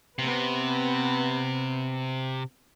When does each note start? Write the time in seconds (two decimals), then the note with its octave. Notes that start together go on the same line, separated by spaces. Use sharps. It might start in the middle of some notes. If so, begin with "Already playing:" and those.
0.19 C3 B3 C4 B4